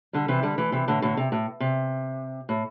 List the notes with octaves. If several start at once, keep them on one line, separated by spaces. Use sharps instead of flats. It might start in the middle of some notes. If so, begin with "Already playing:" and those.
D3 G3
C3 E3
D3 G3
E3 A3
C3 E3
A2 D3
A2 D3
C3
A2
C3
A2